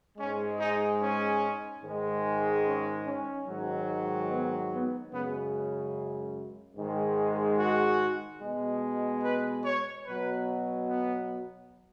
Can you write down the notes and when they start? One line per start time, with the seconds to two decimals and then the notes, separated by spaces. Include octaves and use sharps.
0.18 G#2 G#3 C#4
0.59 D#4
1.01 C#4
1.83 G#2 D#3 G#3
2.66 C#4
3.06 C#4
3.47 G#2 D#3 F#3
4.30 B3
4.71 B3
5.12 F#2 C#3 G#3 B3
6.76 G#2 D#3 G#3
7.58 F#4
8.41 B2 G#3
9.24 B4
9.65 C#5
10.05 B2 F#3 B4
10.88 B3